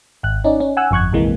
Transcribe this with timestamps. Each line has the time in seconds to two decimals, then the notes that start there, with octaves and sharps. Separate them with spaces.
0.23 G#1 F#6
0.44 C#4 D#4 D5
0.60 C#4
0.77 F#5 G#5 E6 F#6
0.91 G1 F2 C#6 F#6 G#6
1.13 A#1 F2 C3 E3 G#3 A#3